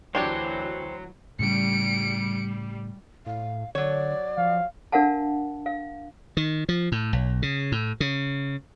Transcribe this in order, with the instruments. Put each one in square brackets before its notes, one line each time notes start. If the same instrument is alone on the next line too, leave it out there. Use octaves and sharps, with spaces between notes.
[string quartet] D2 E3 [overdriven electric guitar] F#3 [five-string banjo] D4 G4 C#5 [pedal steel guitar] C5 G5
[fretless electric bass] A2 C#3 [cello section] G3 [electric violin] C#7 D7
[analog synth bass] A2 [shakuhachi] F5
[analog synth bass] D3 [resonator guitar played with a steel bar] F#3 C#5 [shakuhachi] D5
[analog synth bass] F3 [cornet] F5
[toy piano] D4 A#4 F5 F#5 A5
F5
[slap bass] D#3
F3
A2
B1
C#3
A2
C#3